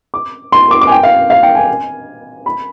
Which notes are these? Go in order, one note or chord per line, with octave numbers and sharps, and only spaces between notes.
D6
C6
D6
D6
G#5
G5
F5
F5
G5
G#5
B5